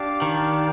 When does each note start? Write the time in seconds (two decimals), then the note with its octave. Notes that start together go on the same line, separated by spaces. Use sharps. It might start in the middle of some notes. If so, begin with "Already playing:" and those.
Already playing: D4 G4 D5 F5 A5
0.22 D#3